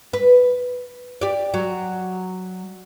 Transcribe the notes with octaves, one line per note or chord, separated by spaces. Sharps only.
B4
G4 D5
F#3